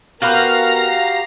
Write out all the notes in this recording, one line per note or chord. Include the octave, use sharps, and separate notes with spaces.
B3 F#4 G4 A#4 B4 F5 A#5 A#6